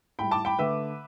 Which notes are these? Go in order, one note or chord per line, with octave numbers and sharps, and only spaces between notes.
A2 G3 G5 B5
A5 D6
G5 B5
D3 A3 B4 E5